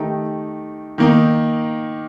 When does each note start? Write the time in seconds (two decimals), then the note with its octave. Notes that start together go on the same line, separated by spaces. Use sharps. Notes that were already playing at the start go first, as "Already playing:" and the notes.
Already playing: D#3 A3 D#4 G4
0.98 D#3 A#3 D#4